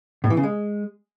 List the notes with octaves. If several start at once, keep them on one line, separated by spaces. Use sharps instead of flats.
A2
E3
C#3
G#3